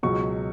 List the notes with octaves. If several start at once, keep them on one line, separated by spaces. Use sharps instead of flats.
C#2 B2 F#3 C#6